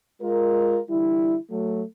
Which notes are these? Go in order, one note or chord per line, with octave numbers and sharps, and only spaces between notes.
G#3 F4 A#4
D3 E3 G3 E4
F#3 A3